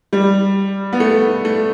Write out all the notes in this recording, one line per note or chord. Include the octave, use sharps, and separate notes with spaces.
G3
B3
A3
A3